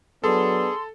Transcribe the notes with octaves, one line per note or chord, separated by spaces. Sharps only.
F#3 B3 D4 G#4 A4 C6